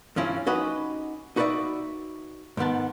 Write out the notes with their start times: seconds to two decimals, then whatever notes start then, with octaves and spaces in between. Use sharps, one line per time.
0.16 G2 F3 C#4 E4
0.47 C#4 D#4 F#4 G4 B4 D#5
1.36 D#4 F#4 B4 C5 D5 E5
2.57 G#2 D#3 B3 A5